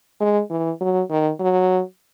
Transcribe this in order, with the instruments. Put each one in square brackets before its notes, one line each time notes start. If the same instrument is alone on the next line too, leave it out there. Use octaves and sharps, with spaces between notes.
[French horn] G#3
E3
F#3
D#3
F#3